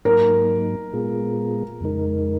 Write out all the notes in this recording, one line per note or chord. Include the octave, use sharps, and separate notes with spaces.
G#2 F#3 A#3 D#4 A#4
A#2 G#3 B3 F4 G#4
F2 C#3 G#3 D#4 A#4